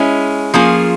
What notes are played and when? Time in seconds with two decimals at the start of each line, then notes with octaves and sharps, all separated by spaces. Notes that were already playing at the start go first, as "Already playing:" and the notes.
Already playing: G#3 C#4 E4
0.54 F3 A#3 C#4 F4 G#4